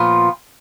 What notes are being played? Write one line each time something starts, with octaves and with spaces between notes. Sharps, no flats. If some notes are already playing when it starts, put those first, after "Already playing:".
Already playing: A#2 F3 B3 F4